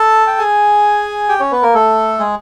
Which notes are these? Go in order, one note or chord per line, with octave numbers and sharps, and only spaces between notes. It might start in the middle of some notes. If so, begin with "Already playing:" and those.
Already playing: A4 A5
G5
G#4 G#5
G4 G5
C#4 C#5
B3 B4
A#3 A#4
A3 A4
G#3 G#4